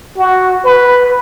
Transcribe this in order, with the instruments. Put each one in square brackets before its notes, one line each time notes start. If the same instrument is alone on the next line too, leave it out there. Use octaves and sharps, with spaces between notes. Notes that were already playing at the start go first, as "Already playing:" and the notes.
[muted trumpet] F#4
B4